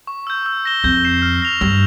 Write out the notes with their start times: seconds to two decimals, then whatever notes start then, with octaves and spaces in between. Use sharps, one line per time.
0.07 C#6
0.27 E6 G6
0.46 E6
0.65 A#6 E7 G7
0.84 F2 G6
1.04 C7 E7 G7
1.22 F6
1.42 A#6 F7
1.61 G2 E6